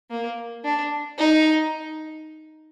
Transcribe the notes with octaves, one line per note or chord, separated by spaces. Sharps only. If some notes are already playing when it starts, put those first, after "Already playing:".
A#3
D4
D#4